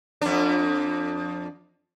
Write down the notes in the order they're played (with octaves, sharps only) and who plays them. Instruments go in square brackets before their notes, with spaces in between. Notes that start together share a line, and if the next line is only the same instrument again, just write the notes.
[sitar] F2 D4